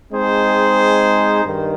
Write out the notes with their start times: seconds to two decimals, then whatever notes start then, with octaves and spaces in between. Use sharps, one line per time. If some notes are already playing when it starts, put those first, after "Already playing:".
0.12 G#3 C4 D#4 G#4 C5
1.44 G2 D#3